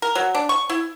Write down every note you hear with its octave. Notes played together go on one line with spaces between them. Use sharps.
A#4
F#3
D4
C#6
E4